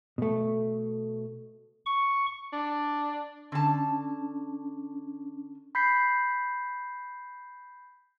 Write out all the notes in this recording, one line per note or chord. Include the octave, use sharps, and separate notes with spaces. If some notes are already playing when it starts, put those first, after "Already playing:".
B2 A3
C#6
D4
D3 C#4 D4 A5
B5 G6 B6 C7